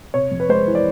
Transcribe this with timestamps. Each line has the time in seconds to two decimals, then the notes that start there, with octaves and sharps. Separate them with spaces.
0.14 C3 C#5
0.31 F2
0.40 B4
0.49 G#3 C5
0.67 E3
0.75 D5